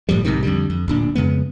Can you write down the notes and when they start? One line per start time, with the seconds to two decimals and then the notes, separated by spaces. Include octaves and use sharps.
0.09 G1 A2 F3 G3
0.24 B1 G#2 C3 D#3
0.43 F2 D3 G3
0.70 F2
0.88 D1 A#2 D4
1.15 F2 C#3 G#3 B3